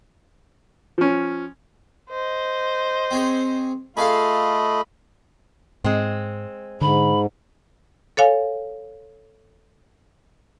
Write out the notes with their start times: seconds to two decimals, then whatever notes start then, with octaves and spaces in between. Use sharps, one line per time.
0.98 F3 C#4
2.10 C5 D#5
3.11 C4 G#4 C#5
3.97 A3 F4 G#4 A4 D#5 F5 B5
5.84 G#2 G#3 C4
6.81 G#2 D3 B5
8.17 A4 C#5 F5 G#5